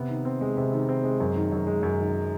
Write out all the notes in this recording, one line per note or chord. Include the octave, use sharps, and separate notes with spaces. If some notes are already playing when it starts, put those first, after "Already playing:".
Already playing: C3 B3
D#3
C4
G#3
C3
D#3
C4
G#3
F#2
D#3
F#2
G#3
F#2
D#3